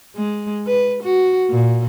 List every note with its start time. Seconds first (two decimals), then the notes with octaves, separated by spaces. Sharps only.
0.16 G#3
0.67 B4
1.03 F#4
1.50 A#2